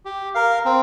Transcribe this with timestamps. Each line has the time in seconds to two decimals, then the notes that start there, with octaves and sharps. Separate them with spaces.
0.05 G4
0.35 A#4 F5
0.65 C4